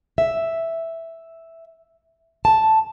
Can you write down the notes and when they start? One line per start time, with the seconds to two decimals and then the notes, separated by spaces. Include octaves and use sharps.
0.18 E5
2.45 A5